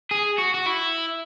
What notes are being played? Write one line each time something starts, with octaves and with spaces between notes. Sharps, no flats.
G#4
F#4
F#4
E4